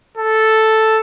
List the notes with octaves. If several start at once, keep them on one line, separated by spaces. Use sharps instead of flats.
A4